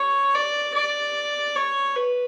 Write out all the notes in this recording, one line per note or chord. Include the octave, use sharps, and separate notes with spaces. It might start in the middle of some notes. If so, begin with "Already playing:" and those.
Already playing: C#5
D5
D5
C#5
B4